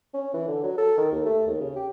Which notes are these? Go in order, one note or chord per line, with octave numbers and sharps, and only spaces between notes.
C#4
E3
D3
F#3
A4
D#3
D#2
A3
D#2
C#3
G4